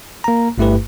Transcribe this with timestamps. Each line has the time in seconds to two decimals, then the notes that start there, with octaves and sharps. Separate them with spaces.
0.24 A#3 A#5
0.58 G1 G2 A3 E4 G4 B4